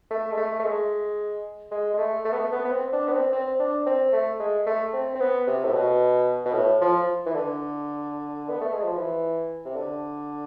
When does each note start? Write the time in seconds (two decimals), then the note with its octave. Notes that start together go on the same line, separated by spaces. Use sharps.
0.10 A3
0.32 G#3
0.37 A3
0.59 A3
0.64 G#3
1.71 G#3
1.94 G#3
1.98 A3
2.25 A3
2.32 B3
2.39 A3
2.52 B3
2.65 B3
2.72 C4
2.92 D4
3.08 B3
3.12 C4
3.32 C4
3.59 D4
3.86 C4
4.13 A3
4.40 G#3
4.66 A3
4.93 C4
5.15 C4
5.20 B3
5.47 C3
5.64 A2
5.74 B2
6.45 B2
6.54 A2
6.81 F3
7.26 E3
7.35 D3
8.49 B3
8.61 A3
8.73 G#3
8.84 F3
8.96 E3
9.65 C3
9.76 D3